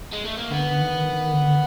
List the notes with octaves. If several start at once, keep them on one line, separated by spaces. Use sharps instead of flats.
G#3
A3
A#3
D3 B3
D3
D#3
D#3
D3